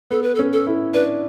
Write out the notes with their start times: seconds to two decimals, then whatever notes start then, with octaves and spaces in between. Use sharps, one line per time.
0.11 B3 A4
0.23 B4
0.35 A4
0.39 C#4
0.53 A4
0.67 E4
0.94 D4 B4